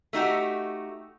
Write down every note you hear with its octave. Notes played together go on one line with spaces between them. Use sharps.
A3 D#4 F#4 G4